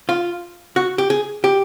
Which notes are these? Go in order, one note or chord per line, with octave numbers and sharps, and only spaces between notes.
F4
F#4
G4
G#4
G4